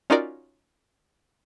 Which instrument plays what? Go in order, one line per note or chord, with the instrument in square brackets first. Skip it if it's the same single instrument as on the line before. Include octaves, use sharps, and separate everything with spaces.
[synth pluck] C#4 D#4 F4 F#4 A#4 D5